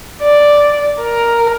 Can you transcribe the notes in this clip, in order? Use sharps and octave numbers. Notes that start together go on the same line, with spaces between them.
D5
A#4